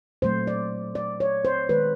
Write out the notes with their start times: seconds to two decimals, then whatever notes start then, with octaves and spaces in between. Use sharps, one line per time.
0.22 A#2 F#3 A3 C5
0.47 D5
0.95 D5
1.20 C#5
1.45 C5
1.69 D#3 G#3 B4